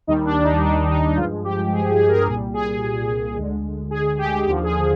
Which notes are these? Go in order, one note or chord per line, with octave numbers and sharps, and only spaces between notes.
D#2 D#3 G3 D#4
D4
D#4
D4
D#4
G2 F3 G#3 F4
G4
G#4
G#4
A#4
C2 A#2 G3 G#4
G#4
D2 D3 G#3
G#4
G4
D#2 D3 F3 G4
G#4